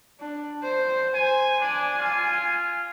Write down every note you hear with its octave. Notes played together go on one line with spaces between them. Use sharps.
D4
C5
C5 G#5
D4 G#5
F4